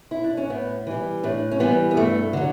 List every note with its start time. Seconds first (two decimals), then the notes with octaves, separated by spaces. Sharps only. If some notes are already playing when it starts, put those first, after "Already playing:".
0.11 E4
0.24 D4
0.37 C#4
0.50 A2 B3
0.87 E3 G3
1.23 A2 D4
1.51 C#4
1.60 E3 G3 B3
1.91 B3
1.97 G2 A3
2.33 D3 F#3